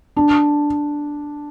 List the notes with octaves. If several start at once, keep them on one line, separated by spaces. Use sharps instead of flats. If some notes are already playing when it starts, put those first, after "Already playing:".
D4